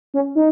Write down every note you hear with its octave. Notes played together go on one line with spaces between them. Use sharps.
C#4
D#4